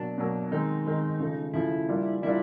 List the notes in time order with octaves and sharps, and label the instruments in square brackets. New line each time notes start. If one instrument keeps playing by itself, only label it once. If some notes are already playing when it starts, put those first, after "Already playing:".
Already playing: [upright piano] B2 F#3 A#3 [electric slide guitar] D4
[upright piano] B2 F#3 A#3
[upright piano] D#3 G#3 C4 [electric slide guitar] D#4
[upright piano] D#3 G#3 C4
C#3 F3 A3
[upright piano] C#3 F3 A3 [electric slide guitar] E4
[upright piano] G3 A#3 D4 F4
[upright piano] G3 A#3 D4 F4 [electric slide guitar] E4